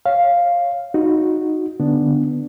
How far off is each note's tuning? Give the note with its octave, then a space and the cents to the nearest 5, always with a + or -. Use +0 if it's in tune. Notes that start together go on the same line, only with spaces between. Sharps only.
C#5 +0 F5 +0
D#4 +0 F#4 -10
D3 +0 B3 +0 D4 +0